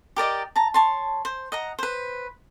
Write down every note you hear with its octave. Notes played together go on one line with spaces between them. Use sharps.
G4 A#4 D5 D#5
A5 A#5
C#5 A5 C6
C5
D#5 F#5 A#5
B4 C5